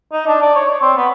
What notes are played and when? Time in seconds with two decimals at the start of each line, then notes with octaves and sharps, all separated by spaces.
0.12 D#4
0.27 D4
0.42 D5
0.56 C#5
0.69 C#5
0.82 C4
0.97 B3